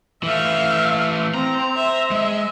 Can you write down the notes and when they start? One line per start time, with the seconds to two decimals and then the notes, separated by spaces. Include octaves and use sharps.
0.23 E3 A3 E5 F5
1.34 C4 A#5
1.76 C5 E5
2.11 G#3 E5